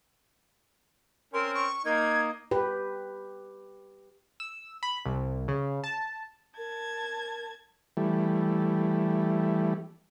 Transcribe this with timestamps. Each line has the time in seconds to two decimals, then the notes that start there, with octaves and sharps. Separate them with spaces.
1.34 C4 C#4 A#4 C6
1.54 C#6
1.85 A#3 D#4 G#6
2.51 G4 B4
4.40 E6
4.83 B5
5.06 C2
5.48 C#3
5.84 A5
6.58 A#4 A5 G#6
7.97 E3 G3 A3